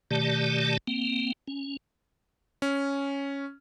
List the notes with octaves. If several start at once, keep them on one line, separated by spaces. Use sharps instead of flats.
B2 D#3 A3 G4 D5 A5
A#3 C4
C#4
C#4